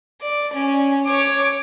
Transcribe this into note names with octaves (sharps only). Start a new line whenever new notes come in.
D5
C#4
C#5 D6